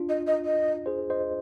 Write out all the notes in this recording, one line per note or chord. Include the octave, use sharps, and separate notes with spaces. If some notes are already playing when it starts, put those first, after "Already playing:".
Already playing: D4 F4
D#5
D#5
D#5
G#4 C5
C5 D#5